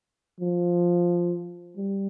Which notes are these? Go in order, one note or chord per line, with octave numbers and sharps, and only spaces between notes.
F3
G3